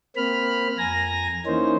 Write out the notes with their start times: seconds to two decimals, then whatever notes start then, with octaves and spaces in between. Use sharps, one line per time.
0.16 A#3 C4 B5 F6
0.78 F2 G#5 A#5 A#6
1.46 E3 A#3 C#4 D#4 C5